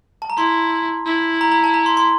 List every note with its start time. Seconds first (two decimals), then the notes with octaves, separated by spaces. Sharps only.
0.22 A5
0.30 A#5
0.37 E4 C6
1.06 E4
1.41 A#5
1.52 A#5
1.64 A5
1.74 A#5
1.86 C6
1.97 C6